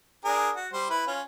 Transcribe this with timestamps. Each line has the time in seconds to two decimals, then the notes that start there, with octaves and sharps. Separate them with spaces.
0.25 D4 G#4 A#4
0.56 F#4
0.73 G3 C5
0.90 E4 B4
1.07 C#4 F4